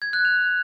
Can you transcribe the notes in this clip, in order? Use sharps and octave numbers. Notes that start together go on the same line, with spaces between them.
G#6
F#6
F7